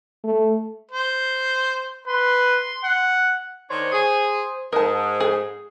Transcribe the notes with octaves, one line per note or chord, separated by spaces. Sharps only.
A3
C5
B4 C6
F#5
D#3 D4 C5 C#5
G#4
G#2 A#4 A5 D#6
G#4